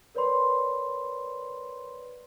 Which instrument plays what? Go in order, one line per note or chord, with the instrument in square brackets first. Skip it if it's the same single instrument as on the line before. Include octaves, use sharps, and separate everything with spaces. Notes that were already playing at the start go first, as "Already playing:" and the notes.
[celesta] A#4 B4 C#5 D5 B5 C6